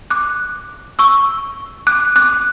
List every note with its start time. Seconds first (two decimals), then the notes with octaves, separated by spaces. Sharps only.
0.10 D6 F#6
0.99 C#6 E6
1.87 D6 F#6
2.16 D6 F#6